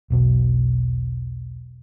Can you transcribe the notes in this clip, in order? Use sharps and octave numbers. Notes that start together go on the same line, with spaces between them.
E1 B1 B2